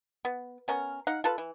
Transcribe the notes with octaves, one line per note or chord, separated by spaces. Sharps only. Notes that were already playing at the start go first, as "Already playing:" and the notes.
B3
B3 C#4 A#4
D#4 F5 F#5
F4 A4 B4
E3